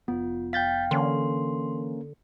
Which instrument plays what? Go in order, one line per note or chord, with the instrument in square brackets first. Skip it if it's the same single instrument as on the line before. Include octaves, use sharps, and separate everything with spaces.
[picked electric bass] F1 B3 [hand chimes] F4
[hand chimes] F5 G5 [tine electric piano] G6 A6 B6
[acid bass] D3 [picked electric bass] E3 [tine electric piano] A#3 C#4 A#4 [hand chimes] C6